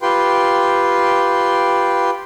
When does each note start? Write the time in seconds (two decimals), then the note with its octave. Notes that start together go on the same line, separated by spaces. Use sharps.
0.02 F4 G4 B4 G5 C6